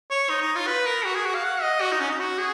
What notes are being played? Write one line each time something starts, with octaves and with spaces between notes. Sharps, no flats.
C#5
D#4
D#4
F4
B4
A#4
F#4
G#4
F#4
F5
F#5
D#5
F#4
D#4
C#4
D#4
F#4
G#4